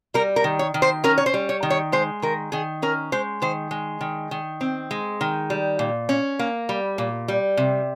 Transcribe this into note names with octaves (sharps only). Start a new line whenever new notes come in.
G3 A#4
A#4
D#3
C#5
D#3
C5
C#4 A#4
C#5
C5
G3
C#5
D#3
C#5
G#3 C5
D#3 A#4
D#3 G#4
C#4 A#4
G#3 C5
D#3 C5
G#3
D#3
D#3
C4
G#3
D#3
G3
A#2
C#4
A#3
G3
A#2
G3
C3